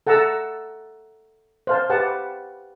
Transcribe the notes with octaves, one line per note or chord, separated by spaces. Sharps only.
A4 F#5 A5 A#5 E6
C5 F5 A5
G4 B4 F#5 A5